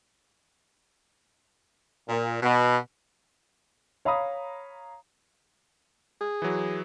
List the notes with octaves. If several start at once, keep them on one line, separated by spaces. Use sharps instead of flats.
A#2
B2
C#5 F5 A#5 B5 D#6
G#4
E3 F#3